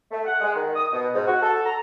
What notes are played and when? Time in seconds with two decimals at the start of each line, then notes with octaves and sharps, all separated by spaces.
0.11 A3
0.25 F#5
0.40 G#3
0.54 D#3
0.74 D#6
0.93 B2
1.14 G#2
1.27 F#4
1.42 A4
1.65 A#5